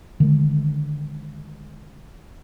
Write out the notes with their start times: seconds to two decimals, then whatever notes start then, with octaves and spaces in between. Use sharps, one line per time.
0.20 D3 D#3 G3 G#3